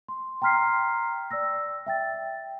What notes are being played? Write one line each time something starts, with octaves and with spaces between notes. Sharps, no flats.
C6
G5 A#5 C6 F6 B6 C7
D5 G5 E6 A#6
E5 G5 A6